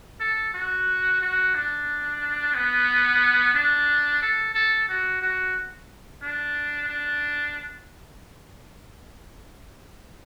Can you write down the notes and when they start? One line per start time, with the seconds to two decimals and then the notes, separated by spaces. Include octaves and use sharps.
0.20 A4
0.54 F#4
1.21 F#4
1.55 D4
2.54 B3
3.54 D4
4.22 A4
4.54 A4
4.89 F#4
5.22 F#4
6.22 D4
6.89 D4